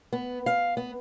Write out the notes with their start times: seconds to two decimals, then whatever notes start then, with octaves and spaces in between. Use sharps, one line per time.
0.13 B3
0.46 F5
0.77 B3